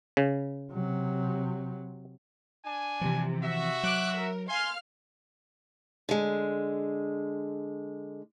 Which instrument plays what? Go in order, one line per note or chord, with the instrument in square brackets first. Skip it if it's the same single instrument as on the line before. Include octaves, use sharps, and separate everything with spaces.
[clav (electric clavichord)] C#3
[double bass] C3 F#3
[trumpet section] D4 G#5
[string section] C3 [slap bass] E3 F3
[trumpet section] F#4 E5
[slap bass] F#3 [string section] D6 F#6
[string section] A#4
[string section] F5 F6 [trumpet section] G#5 C6
[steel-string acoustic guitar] D3 G#3